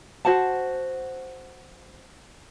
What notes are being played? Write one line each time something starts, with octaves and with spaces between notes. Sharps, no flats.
F#4 C5 F#5 A5